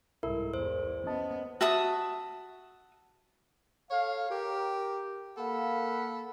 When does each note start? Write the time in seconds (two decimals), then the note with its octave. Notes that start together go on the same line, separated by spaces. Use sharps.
0.23 C2 G#2 E4 A4 A#4 E5
0.54 E2 C5
1.06 B3 C#4 D#5 A5
1.61 F#4 E5 A5 D#6
3.91 A4 C#5 F5
4.30 G4 A#4
5.37 A#3 A4 F5 F#5 B5